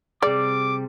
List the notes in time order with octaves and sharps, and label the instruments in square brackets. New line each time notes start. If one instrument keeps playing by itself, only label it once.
[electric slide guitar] C3 G3 [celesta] G#4 [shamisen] D5 [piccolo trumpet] D6